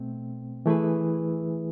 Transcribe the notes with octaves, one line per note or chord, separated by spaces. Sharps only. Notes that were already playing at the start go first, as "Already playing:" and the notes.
Already playing: B2 A3 C4
E3 A3 E4 G#4 B4